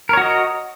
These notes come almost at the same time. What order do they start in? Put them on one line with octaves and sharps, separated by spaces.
A#4 C#5 F#4 D#5